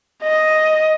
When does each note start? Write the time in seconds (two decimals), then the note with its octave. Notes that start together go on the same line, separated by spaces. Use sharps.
0.23 D#5